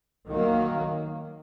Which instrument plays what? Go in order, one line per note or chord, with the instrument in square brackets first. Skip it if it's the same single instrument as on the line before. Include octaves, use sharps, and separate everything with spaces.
[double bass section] D#3 F#3 A#3